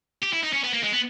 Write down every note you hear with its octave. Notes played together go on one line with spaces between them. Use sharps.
G4
E4
D#4
C#4
B3
A#3
G#3
B3